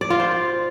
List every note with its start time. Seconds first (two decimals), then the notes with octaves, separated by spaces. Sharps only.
0.01 D5
0.10 F4
0.20 C5